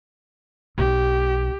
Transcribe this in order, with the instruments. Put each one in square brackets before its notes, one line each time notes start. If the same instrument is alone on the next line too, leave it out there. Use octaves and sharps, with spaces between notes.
[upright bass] B1 [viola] G4